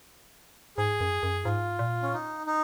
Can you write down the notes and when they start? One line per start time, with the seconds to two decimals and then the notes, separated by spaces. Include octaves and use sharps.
0.77 G#2 G#4
1.01 F#2
1.23 F#2
1.45 G#2 F4
1.79 A#2
2.03 C#4
2.13 D#4
2.47 D#4